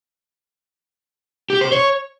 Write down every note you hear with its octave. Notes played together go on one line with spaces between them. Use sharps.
G4
C5
C#5